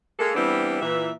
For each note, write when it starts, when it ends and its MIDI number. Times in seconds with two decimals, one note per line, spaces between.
0.19 0.33 56
0.19 0.33 58
0.19 0.33 69
0.35 0.80 52
0.35 0.80 55
0.35 0.80 59
0.35 0.80 60
0.35 0.80 62
0.35 0.80 64
0.82 1.11 46
0.82 1.11 52
0.82 1.11 76